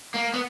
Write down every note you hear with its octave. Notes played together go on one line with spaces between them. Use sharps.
A#3
B3